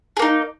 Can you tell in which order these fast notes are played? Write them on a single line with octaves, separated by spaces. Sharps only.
G#4 A#3 D#4